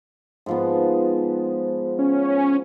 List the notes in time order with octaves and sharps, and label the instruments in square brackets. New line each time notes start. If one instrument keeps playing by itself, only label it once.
[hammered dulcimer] G#2 F3 B3
[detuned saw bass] C#4